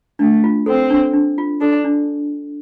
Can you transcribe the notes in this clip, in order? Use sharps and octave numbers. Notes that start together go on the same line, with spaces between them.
A3 D4
F4
C4 A4
D4
D4
F4
D4 A4
D4